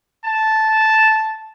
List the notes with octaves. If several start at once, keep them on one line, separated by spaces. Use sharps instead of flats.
A5